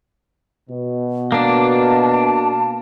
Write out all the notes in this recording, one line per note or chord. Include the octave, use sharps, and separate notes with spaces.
B2
A#3 D4 A5